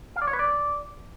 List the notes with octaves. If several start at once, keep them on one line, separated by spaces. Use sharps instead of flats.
F5
D5
C#5
B4
D5